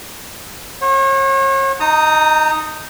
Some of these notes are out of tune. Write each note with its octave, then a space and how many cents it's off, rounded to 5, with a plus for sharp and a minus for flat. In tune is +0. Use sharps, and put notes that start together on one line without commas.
C#5 -40 F#5 +0
D#4 +0 A#5 -35 D#6 +0